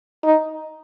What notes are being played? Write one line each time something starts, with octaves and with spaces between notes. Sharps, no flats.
D#4